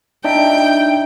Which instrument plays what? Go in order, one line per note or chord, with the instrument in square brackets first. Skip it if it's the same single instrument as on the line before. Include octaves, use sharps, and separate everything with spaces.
[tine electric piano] D4 D#4 E5 [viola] G5